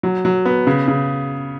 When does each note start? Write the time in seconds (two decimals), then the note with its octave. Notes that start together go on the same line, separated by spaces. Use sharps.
0.03 F#3
0.25 F#3
0.45 B3
0.67 C#3
0.88 C#3